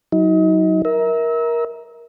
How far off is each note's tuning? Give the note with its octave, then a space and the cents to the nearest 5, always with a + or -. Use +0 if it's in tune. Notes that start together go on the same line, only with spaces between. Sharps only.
F#3 +5 D#4 +35
A#4 +15 E5 -30